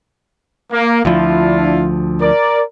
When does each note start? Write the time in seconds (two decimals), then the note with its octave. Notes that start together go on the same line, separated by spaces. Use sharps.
0.72 A#3
1.05 D2 F3 D4 E4 F4
2.20 A#4 D5